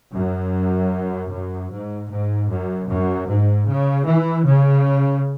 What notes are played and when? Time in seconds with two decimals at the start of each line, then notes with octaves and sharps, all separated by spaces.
0.15 F#2
1.32 F#2
1.72 G#2
2.10 G#2
2.50 F#2
2.89 F#2
3.27 G#2
3.67 C#3
4.06 E3
4.45 C#3